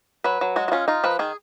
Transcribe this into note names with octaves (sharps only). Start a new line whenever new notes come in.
F#3 B4
F#3
G#3 F#4
F#4
C#4 F4
D#4 F4
F3 B4
D#3 G#4